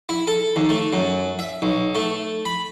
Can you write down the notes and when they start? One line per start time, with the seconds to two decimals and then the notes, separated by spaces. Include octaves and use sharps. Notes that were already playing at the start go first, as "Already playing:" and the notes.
0.09 E4
0.27 A4
0.56 D#2
0.69 A3
0.93 F#2
1.39 E5
1.62 B1
1.95 A3
2.45 B5